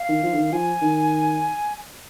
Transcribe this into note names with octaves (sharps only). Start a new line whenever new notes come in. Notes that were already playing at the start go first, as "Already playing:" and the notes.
Already playing: F5
D#3
F3
D3
D#3
F3 G#5
D#3